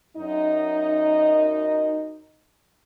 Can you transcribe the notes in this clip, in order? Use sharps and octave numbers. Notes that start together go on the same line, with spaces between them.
F#2 D#4 D#5